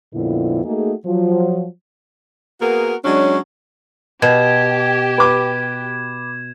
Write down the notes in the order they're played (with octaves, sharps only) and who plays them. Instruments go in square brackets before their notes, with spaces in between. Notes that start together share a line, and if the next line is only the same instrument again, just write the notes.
[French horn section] F2 A#2 D3 B3 E4
A3 A#3 D#4 F#4 G#4
F3 F#3
[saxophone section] A#3 B3 F#4 G#4 A#4
F#3 G#3 C#4 D4
[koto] B2 [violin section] G4 [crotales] G#6 E7
[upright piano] B4 D6